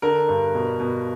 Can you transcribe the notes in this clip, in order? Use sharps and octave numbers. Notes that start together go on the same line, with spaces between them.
D3 A#4
G2
B2
B2